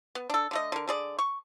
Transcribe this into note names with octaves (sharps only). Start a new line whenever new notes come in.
B3
D4 A4
D3 A3 D#5
D3 A#4
D3 G#4 D5
C#6